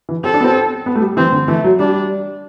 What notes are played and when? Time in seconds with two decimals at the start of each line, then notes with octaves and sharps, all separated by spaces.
0.09 E3
0.24 C4 A4
0.34 D4
0.40 B3
0.44 C4
0.86 B3
0.95 A3
1.01 G3
1.17 E3 C4
1.32 D3
1.48 E3 A3
1.64 F#3
1.79 G3 D4